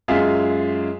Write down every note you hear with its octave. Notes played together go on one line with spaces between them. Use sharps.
F#2 G#3 F4 G#4 E5 F5